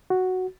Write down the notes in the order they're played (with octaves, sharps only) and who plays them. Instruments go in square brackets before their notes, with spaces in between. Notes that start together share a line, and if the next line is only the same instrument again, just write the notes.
[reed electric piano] F#4